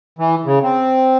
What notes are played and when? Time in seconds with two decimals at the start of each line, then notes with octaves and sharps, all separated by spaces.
0.19 E3
0.45 C#3
0.63 C4